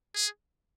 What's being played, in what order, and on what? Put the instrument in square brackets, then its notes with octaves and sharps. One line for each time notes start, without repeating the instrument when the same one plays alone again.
[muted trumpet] G#4